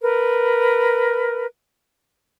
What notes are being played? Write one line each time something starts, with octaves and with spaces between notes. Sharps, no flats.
A#4 B4